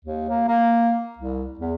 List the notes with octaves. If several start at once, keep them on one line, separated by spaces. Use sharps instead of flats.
D#2
A#3
A#3
C2
E2